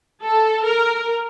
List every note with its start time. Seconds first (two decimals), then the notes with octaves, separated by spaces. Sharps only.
0.22 A4
0.65 A#4